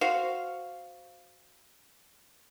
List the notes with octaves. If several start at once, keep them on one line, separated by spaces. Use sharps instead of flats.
F#4 C5 F5